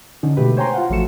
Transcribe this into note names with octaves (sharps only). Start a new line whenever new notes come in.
D3 C#4 D#4
B2 D3 G#3 A3 G4 B4
C5 C#5 G5 G#5 A#5 C6
F4 F5 F#5
A1 F3 A3 F#4 C#7 E7